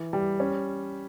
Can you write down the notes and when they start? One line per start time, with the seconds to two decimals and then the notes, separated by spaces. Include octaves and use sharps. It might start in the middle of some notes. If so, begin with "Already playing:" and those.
Already playing: E3
0.13 G3
0.40 C#4